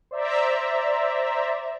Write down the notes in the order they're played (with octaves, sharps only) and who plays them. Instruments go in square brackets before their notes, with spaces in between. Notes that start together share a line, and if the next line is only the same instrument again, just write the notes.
[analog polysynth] C5 D5 E5 A#5